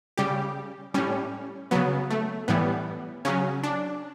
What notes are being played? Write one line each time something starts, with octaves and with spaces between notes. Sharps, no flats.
C#3 G3 G4
A2 G3 C#4
C#3 F#3 B3
A3
A2 E3 G3 B3
C#3 F#3 C#4
D4